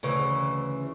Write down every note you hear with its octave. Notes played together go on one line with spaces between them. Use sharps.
D2 C#3 E3